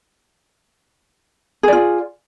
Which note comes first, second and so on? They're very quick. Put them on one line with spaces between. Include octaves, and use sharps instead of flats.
G#4 D5 F4